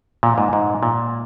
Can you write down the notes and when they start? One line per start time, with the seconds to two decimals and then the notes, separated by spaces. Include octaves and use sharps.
0.23 A#2
0.38 G#2
0.53 G#2
0.83 A#2